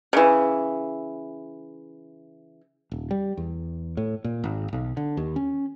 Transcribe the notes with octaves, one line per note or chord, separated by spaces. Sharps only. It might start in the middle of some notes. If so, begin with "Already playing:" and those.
C#3 E3
D#1
G3
E2
A2
A#2
G#1
B1
D3
D#2
C#4